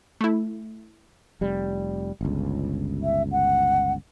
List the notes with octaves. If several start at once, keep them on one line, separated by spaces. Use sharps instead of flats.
A3 E4
F1 G3
G1 C#2
E5
F#5